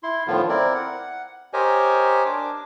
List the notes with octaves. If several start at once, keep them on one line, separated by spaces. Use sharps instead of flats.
E4 C6
A2 D3 D#3 F3 B3 F4
C4 E4 A#4 D5
F#5
G4 A#4 C5 C#5 D#5 G#5
D4 D6